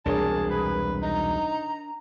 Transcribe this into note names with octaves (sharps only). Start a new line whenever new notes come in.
E1 C2 D4 G#4 A#4 C#5 A5
B4
D#4 A#5